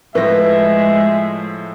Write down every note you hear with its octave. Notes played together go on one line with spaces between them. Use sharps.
A2 F3 G#3 B4 E5 A#6